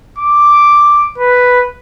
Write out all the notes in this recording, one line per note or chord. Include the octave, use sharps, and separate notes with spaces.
D6
B4